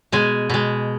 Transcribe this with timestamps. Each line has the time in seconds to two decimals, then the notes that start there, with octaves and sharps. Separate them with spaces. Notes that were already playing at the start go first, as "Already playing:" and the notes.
0.12 B2 G#3 G#5
0.50 B2 G#3